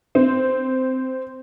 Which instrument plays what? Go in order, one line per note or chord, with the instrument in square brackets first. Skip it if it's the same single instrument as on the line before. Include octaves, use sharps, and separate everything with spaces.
[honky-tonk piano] C4